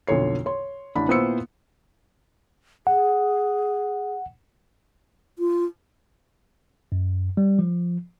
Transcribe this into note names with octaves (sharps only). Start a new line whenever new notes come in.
B1 F2 D3 C#5 C7
C#5 C6
A1 D4 B5
A#2 B3 E4 C5 E6 C#7
G#4 F#5
F4
F#2
G3
F3